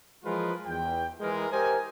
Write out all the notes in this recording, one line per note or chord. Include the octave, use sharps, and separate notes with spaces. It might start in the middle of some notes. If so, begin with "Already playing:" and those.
E3 F3 G#3 F4 A#4 B4
E2 G5
E3 G#3 A#4
G4 A#4 C5 D#5 G#5